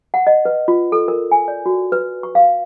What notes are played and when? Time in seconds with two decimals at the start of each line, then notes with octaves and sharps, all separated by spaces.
0.14 F#5
0.27 D#5
0.45 B4
0.68 F4
0.92 A4
1.08 A#4
1.32 G#5
1.48 D5
1.66 F#4
1.92 B4
2.23 C#6
2.35 F5